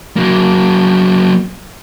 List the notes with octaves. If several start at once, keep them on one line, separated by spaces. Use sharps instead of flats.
F#3 A#3